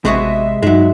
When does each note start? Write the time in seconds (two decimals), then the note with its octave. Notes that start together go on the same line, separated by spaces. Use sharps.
0.05 A1 C3 G#3 B3 F#4 G#4 E5
0.63 G2 F#3 G#3 D#4 E5